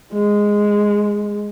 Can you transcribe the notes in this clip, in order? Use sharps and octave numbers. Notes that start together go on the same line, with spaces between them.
G#3